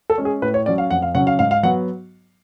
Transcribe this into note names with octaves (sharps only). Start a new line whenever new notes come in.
A4
G#3 C#4
G#4
A2 B4
C#5
F#3 C#4 D5
F5
F2 F#5
F5
C#3 F#3 C#4 F#5
F5
G#2 F5
F5
F#3 B3 F#5